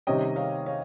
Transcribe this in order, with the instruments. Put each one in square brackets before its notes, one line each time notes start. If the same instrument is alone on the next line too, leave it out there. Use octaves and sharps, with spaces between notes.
[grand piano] C3 D#3 G3 C#4 [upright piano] D#5 G5
[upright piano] C#5 F5
C#5 F5